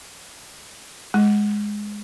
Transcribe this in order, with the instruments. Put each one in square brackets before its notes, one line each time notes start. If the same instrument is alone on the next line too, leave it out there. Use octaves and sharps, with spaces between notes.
[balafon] G#3